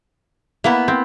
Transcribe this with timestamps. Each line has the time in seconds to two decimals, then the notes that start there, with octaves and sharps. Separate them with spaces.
0.64 A#3 B3 E4 E5
0.88 C4